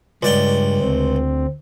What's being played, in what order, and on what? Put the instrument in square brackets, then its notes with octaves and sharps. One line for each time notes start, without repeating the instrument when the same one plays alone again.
[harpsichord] C#2 D5 G5 [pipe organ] G2
[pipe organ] D2 C4